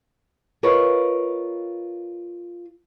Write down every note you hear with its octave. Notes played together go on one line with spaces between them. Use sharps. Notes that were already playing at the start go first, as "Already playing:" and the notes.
F4 A#4 B4 C#5 D#5 F5